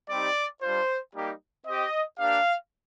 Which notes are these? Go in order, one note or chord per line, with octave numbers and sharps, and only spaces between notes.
G3 C4 D#4 G4 D5
G3 D4 F4 C5
G3 A#3 D#4 G4
C4 G4 D#5
A#3 D4 G4 F5